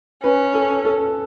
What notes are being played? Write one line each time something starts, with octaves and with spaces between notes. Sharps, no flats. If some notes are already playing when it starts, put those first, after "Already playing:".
C#4 B4
A4
A4